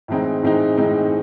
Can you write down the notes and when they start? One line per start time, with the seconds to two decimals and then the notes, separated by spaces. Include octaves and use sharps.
0.08 A2 E3 G#3 C4 D#4
0.43 A2 E3 G#3 C4 D#4
0.77 A2 E3 G#3 C4 D#4